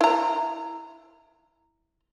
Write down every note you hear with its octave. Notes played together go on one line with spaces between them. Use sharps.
E4 A#5